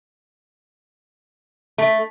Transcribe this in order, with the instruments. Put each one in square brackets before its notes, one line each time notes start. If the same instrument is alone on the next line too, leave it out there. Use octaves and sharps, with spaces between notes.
[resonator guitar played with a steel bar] A3